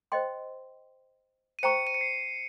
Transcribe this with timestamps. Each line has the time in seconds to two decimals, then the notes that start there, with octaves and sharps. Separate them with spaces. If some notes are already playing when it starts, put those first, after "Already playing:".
0.12 C5 D#5 G5 C6
1.59 D#7
1.63 C5 G5 A#5 C#6 C#7
1.87 D#7
1.94 C#7
2.01 C7